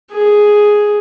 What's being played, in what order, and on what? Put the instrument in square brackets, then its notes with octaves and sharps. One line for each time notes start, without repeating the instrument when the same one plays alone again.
[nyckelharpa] G#4